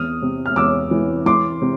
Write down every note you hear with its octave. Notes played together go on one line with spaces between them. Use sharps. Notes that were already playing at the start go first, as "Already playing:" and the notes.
Already playing: E2 D#6 F6
C3
F6
E2 D6 E6
E3
E3 C6 D6
C3